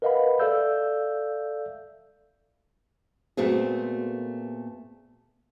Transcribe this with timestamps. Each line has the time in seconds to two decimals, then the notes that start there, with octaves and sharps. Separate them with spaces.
0.02 A#4 B4 D#5 F5 F#5 B5
0.40 A4 D5 E5 F5 E6 G6
3.37 A#2 A3 B3 C4 F#4 G#4